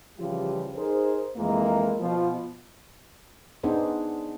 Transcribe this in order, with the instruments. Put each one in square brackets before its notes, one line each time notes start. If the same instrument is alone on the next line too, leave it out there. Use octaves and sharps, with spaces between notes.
[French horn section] C#3 E3 F3 G3 F4 G4
D#4 G#4 A#4 C5
F2 E3 G#3 A#3 A#4
B2 F3
[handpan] B3 D4 D#4 G#4 C5